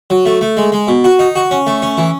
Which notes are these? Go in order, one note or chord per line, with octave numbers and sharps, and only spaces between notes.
F#3
A3
A3
G#3
G#3
B2
F#4
D#4
F#4
C#4
A3
C#4
E3